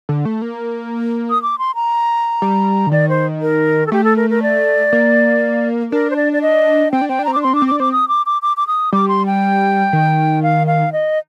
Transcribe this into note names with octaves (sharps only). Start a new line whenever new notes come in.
D3
A3
A#3
D#6
D6
C6
A#5
G3
D3
D#3 D5
C5
A#4
A4
A3 G4
A4
A#4
A#4
D5
A#3
D4 A#4
C5
D5
D5
D#5
C4 G5
D4
C4 G5
D4
C4 A#5
D4 D6
C4 C6
D4 D6
C4
D6
D4
C4 D6
D#6
D6
D6
D6
D6
D#6
G3 D6
C6
G5
D#3
F5
F5
D#5